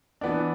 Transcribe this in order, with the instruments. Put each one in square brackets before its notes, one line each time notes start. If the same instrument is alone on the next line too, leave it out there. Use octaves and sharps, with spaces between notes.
[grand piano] E3 B3 D4